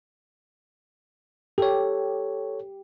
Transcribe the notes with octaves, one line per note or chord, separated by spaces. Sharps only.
G4 A4 C#5